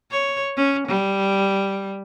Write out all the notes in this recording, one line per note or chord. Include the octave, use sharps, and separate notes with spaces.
C#5
C#4
G3